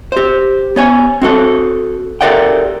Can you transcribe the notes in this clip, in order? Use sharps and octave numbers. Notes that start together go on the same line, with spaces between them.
G4 C5
B3 C#5 G#5
C4 F#4 A4
G4 A4 A#4 D5 F#5 G5